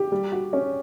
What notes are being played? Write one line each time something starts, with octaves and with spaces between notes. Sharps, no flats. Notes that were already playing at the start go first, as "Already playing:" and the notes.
Already playing: G4
G3
F#4
C#4